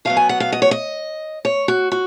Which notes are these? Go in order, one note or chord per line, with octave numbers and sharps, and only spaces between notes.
B2 F#3 B3 F5
G#5
F#5
F5
D#5
C#5
D#5
C#5
F#4
F#4